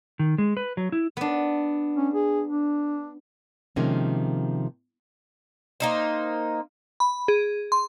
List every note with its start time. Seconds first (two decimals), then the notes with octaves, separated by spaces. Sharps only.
0.19 D#3
0.38 G#3
0.57 B4
0.77 F#3
0.92 E4
1.17 B3 D4
1.97 C#4
2.14 G#4
2.48 D4
3.76 C3 D#3 F3 G#3 A#3 C#4
5.80 A#3 D#4 C5
7.00 B5
7.28 G#4
7.72 C6